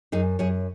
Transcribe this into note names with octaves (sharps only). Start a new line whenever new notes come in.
F#2 D#4 G#4
F#2 G#4 C#5